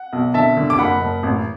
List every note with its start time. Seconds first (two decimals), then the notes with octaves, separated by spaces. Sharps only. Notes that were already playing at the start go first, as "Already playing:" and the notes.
Already playing: F#5
0.13 B1
0.34 D3 E5 A5
0.57 D3
0.70 D6
0.79 F#1 F#5 B5
1.01 F#1
1.23 A1